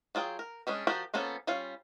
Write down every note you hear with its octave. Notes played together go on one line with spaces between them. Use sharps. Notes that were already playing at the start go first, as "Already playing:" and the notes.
F#3 F4 G#4 G5
A#4
G3 G#3 C#4 D4
F3 F#4 G4 A#4 D5
F3 A#3 B3 C#4 A4
G3 C#4 F4 F5